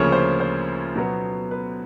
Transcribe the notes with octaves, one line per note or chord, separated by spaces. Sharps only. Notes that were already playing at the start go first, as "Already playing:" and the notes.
Already playing: D2 C#3 F3 A#3 C#4 C#5
C5
C5
B2 F#3 B3
B4